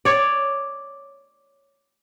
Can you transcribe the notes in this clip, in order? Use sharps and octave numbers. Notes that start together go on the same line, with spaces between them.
C#5 D5